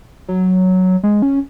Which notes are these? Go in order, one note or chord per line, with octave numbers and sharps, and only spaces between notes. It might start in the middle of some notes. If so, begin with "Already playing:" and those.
F#3
G#3
C#4